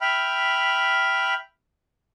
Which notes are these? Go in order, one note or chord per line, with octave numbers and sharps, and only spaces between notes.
E5 G5 B5 F6